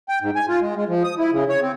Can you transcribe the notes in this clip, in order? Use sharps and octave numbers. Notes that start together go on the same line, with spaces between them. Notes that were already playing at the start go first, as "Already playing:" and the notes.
G5
G#2
G#5
F4
G#3
G#3
F3
D#6
E4
C#3
C#5
C4